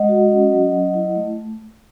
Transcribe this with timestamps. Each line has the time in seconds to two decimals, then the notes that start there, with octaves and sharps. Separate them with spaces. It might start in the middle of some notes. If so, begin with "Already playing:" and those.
Already playing: G#3 D#5 F#5
0.09 F#4
0.31 C#4
0.52 F#3
0.73 F#3
0.94 E4
1.16 A3